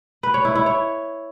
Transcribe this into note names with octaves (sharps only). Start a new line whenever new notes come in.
B4
C#5
E4
E4
C#5